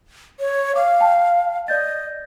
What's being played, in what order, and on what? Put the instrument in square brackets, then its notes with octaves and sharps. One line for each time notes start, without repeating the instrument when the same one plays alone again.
[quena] C#5
[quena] F5 [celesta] D6
[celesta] G5 A5
[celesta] D5 G6 A6 [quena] D#5